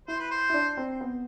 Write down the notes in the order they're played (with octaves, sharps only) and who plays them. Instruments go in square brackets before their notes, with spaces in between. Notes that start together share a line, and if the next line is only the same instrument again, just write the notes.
[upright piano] E4 [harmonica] C5
[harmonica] B4
C5
[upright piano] E4
D4
C4
B3